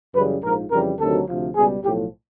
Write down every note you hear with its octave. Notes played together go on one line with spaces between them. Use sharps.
F#2 C#3 E3 G3 B4
A#1 G#2 F3 A#4
F2 C#3 E3 G3 A#4
D2 C3 D#3 F#3 A4
D2 C3 F3
C#2 B2 G3 G#4
B1 A2 F3 G4